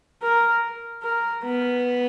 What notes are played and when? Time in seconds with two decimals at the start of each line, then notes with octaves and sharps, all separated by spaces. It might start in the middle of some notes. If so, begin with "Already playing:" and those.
0.22 A#4
1.03 A#4
1.44 B3